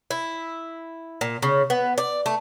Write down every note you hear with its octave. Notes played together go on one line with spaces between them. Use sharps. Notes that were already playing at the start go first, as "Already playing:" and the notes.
E4
A#2
C#3
B3
D5
A3